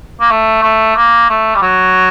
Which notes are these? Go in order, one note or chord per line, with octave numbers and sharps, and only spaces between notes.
A#3
A3
A3
A#3
A3
G3
F#3